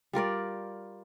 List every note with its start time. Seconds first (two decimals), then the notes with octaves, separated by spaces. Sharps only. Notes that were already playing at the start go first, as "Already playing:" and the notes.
0.13 G3 F4 A#4 D5